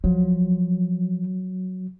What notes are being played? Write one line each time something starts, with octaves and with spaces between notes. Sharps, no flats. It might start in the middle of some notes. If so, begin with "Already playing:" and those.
F3 F#3